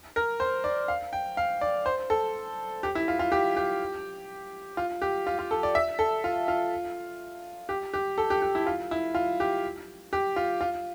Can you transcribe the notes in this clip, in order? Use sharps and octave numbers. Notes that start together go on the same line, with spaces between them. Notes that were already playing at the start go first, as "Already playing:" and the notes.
A#4
C5
D5
F5
G5
F5
D5
C5
A4
G4
E4
F4
F4
G4
G4
F4
G4
F4
F4
A4
D5
E5
A4
F4
F4
G4
G4
A4
G4
G4
E4
F4
E4
F4
G4
G4
F4
F4